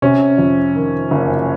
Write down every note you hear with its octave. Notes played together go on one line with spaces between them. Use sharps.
C3 C#4
F2
D#3
F#1